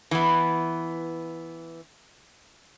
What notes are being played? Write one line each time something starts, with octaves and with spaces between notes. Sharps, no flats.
E3 B3